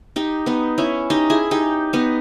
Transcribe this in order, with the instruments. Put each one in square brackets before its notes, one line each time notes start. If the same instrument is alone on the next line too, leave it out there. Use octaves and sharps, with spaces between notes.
[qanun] D#4 G4
B3 D#4
C#4 E4
D#4 G4
E4 G#4
D#4 G4
B3 D#4